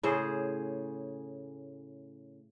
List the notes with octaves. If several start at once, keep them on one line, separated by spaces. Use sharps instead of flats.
A2 C#3 G#4 C5